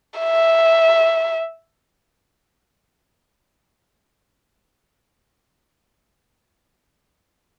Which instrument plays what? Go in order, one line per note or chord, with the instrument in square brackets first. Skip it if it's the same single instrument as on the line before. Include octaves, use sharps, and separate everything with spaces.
[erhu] E5